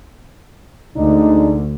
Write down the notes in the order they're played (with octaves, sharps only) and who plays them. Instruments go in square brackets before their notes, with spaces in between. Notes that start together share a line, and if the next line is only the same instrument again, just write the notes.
[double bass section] D2 [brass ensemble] G#3 D4 D#4